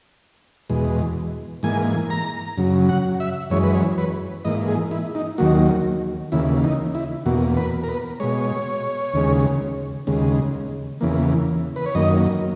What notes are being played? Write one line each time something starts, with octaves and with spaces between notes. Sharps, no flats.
E2 B2 G#3
G#2 E3 A#3 G#5
A#5
F#2 C#3 F#3
F#5
E5
F#2 E3 G#3 C#5
B4
C#5
B4
G#2 E3 A#3 D#5
G#4
E4
D#4
D#2 D#3 F#3 A#3 F#4
D#2 C#3 E3 A#3 E4
D#4
E4
E2 B2 A#3 F#4
B4
A#4
B4
B2 G#3 C#5
D#2 C#3 G#3
D#2 C#3 G#3
E2 C#3 E3 A#3
B4
C#5
F#2 D#3 A#3 D#5